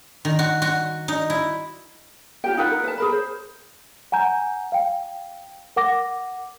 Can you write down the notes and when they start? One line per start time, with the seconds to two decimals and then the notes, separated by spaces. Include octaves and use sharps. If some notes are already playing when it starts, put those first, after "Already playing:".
0.25 D#3
0.39 F#4
0.62 F#4
1.08 D#4
1.30 E4
2.44 F4 G4 G5
2.57 D#4 F4 B4 F#5
2.71 A#4
2.84 B4 A5
2.98 G#4 A#4 B5
3.12 C5
4.12 F#5 G#5 A#5 G6
4.72 F5 G5
5.76 A#4 F#5 D6 A#6